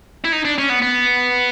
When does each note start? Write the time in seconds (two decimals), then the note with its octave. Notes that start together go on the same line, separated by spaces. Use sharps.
0.24 E4
0.32 D#4
0.45 D4
0.58 C#4
0.69 B3
0.82 B3